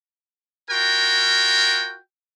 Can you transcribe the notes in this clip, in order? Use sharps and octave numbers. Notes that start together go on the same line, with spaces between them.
F4 F#4 A#4 G5